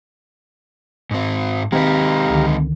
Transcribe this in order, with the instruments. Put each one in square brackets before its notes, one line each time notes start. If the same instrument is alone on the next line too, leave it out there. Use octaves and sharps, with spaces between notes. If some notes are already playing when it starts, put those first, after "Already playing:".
[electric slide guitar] G#2 C4
[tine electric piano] D#3 [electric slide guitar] G#3 D#4 B4 [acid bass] C4 [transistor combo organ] G4 F5 A#5
[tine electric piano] C#2 D3 D#3